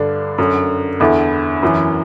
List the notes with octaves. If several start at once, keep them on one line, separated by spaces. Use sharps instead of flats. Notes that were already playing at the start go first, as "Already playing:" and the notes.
Already playing: G2 D3 D4
F#2 D3
E2 D3 E4
F#2 E3